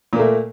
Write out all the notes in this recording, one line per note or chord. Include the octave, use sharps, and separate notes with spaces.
A#2 A3 A#3